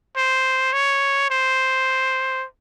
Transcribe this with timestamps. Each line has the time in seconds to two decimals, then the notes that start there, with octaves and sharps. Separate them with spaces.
0.17 C5
0.73 C#5
1.31 C5